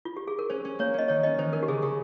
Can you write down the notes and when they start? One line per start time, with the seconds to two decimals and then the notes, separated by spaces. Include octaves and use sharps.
0.05 F4
0.17 G4
0.28 G#4
0.39 A#4
0.50 C#4 C5
0.65 C#4
0.79 A#3 C#5
0.94 C#4 D#5
1.08 D#3 C#5
1.23 C#4 D#5
1.38 D#3 C5
1.53 C#4 A#4
1.63 G4
1.68 C#3 G#4
1.82 C#3 G4